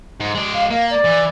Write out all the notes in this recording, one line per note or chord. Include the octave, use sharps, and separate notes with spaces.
G#2
G#3 D5
F5
A#3 F5
D5
E3